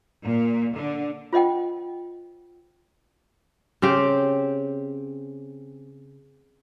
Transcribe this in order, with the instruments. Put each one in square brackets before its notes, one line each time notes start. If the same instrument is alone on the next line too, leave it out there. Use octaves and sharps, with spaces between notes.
[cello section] A#2
D3
[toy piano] F4 C5 D#5 F#5 G5
[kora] C#3 C4 G4